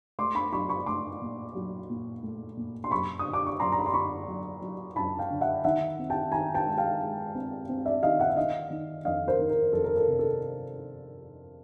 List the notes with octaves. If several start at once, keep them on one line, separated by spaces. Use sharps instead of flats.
A3 C6 D6
B5 C#6
F#3 B5 C#6
B5 C#6
A3 C6 D6
A#2
F#3
A#2
A3
A#2
C6
F#2 B5 C#6
D#6
D3
D6
C#6
F#2 A#5 C6
A#5
B5
C6
D3 B5 C#6
F#3
F#3
F#2 A5 B5
F5 G5
D3
E5 F#5
D#3 E5 F#5
C4
G5 A5
D#3 G#5 A#5
G5 A5
G#3
F5 G5
G#3
C4
C4
D5 E5
D#3 D#5 F5
E5 F#5
E5
D#3 D#5 F5
D#3
F2 D#5 F5
A#4 C5
D#3
A#4
F2 A4
A#4
A4
C3
A4